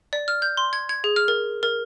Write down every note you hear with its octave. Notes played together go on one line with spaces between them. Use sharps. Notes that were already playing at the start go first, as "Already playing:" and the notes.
D5
F6
G6
C6
G#6
G#6
G#4
F6
A#4
A#4